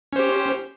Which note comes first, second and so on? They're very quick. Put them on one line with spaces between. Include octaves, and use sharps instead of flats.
C#4 C5 G4